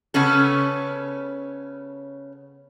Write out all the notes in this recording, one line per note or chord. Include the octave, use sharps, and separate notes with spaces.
C#3 B3 C#4 A4